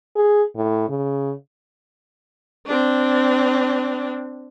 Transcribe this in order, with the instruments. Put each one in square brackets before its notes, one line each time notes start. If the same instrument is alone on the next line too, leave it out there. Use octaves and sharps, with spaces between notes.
[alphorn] G#4
A2
C#3
[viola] C4 D4